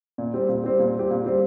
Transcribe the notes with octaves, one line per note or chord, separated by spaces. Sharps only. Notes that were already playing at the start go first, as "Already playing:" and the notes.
A#2
G3 C4 G4
A#2
G3 C4 G4
A#2
G3 C4 G4
A#2
G3 C4 G4